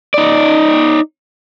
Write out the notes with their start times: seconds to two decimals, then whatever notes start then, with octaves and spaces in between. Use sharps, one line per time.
0.14 D#4 D5